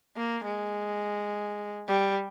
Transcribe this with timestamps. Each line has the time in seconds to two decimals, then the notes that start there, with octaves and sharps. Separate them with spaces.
0.17 A#3
0.45 G#3
1.88 G3